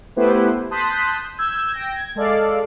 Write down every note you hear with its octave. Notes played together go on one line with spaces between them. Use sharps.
A3 B3 E4 G4 B4 C5
A5 C6 D#6 F#6 G6 B6
E6 G6 G#6
G5 A#6
G#6
G#3 A4 D5 F5